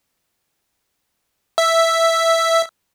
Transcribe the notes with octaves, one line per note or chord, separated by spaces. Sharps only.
E5